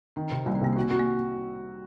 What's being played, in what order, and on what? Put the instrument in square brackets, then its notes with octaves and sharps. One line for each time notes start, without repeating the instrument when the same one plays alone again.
[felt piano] D#3 [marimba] C4
[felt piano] C3
[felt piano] C2 [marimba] A#3
[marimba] C4
[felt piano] C3 [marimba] A#3
[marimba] C4 [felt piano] F#4
[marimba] A#3
[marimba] C4 [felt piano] F#4
[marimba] A#3